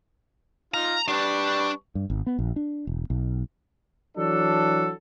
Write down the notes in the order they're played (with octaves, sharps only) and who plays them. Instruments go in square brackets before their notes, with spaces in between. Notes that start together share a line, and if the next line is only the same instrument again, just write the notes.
[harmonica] D#4 F4 F5 [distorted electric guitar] A#5
[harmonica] G3 B4 C#6 [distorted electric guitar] D4
[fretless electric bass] G2
G#1
B3
A#1
D4
E1
B1
[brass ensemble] E3 F#3 D4 A4